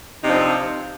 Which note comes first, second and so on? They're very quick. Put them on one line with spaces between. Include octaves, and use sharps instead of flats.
D#4 C3 D4 F3 C4